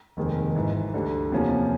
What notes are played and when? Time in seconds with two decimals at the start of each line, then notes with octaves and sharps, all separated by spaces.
0.17 F1 D#2 D#3 G#3 C4
0.55 G#1 G#2 E3
0.94 D2 D3 G3
1.32 E2 C3 F3 A#3 C#4